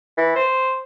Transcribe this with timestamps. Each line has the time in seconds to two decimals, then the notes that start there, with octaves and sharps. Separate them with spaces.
0.17 E3
0.36 C5